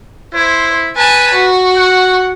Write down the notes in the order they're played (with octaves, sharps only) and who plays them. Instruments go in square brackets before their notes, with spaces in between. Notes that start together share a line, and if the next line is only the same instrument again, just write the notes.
[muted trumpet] E4 [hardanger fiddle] C5
[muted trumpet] B4 [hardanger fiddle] G#5 A5
[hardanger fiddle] F#4
[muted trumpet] F#5